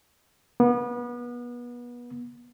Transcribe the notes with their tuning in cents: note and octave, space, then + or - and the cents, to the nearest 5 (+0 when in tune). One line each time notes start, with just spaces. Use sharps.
B3 -30